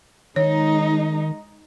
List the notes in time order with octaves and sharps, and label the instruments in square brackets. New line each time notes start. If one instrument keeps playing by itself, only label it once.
[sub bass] D#3 [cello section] G#3 D#4 [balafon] C#5